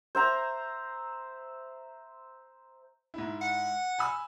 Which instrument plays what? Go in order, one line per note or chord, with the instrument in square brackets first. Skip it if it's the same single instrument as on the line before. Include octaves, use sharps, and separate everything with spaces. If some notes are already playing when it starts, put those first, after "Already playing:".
[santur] C5 E5 A#5
[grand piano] G#2 E4
[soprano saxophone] F#5
[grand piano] G#5 B5 E6